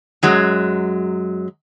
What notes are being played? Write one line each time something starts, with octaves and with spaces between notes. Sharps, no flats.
F#2 F#3 G#3